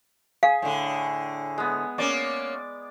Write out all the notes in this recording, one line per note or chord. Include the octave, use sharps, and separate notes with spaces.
G#4 F5
A2 D3
G#3 B3
A#3 C#4 D5 D6